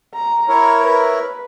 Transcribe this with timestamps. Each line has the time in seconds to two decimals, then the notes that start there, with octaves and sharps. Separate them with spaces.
0.15 A#5
0.49 E4 A#4 C#5
0.81 B4